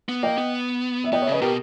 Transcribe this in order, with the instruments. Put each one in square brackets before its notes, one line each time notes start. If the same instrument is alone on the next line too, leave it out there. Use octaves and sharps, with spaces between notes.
[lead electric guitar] B3
[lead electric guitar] A#3 [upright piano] D#5 G5
[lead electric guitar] B3
[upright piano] E5
[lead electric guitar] B3 [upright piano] D#5 G5
[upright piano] C#5 E5
[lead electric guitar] C#3 [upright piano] B4 D#5
[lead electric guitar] B2 [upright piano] G4 A#4